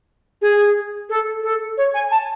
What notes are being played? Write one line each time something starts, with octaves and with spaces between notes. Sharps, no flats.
G#4
A4
A4
C#5
G#5
A5